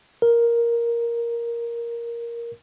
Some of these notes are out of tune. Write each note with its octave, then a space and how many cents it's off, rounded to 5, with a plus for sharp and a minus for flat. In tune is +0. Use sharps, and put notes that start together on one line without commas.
A#4 +5